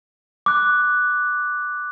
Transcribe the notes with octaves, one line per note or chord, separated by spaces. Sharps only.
D6 F#6